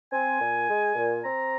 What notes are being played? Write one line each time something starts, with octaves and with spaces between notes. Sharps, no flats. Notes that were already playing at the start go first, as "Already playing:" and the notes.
C4 G#5
A#2
G#3
A#2
C4 A#5